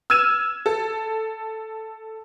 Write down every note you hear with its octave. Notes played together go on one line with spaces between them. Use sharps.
E6 F6 G#6 D#7 E7
A4